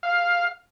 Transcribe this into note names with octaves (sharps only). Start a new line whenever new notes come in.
F5